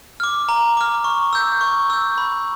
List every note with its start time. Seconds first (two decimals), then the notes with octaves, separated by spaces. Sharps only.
0.20 D6 F6
0.49 A#5
0.77 D6 F6
1.04 C#6
1.33 E6 G6
1.61 C#6
1.90 E6 G6
2.18 B5